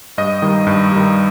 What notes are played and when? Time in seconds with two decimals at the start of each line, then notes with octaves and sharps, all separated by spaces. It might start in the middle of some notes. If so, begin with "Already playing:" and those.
0.18 G2 D#5
0.42 D#3 G3
0.67 G2
0.92 D#3 G3